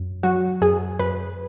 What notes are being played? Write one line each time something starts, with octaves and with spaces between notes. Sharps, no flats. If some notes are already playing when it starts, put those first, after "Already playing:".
Already playing: F#2
F#3 F#4
F#2 G#4
F#2 B4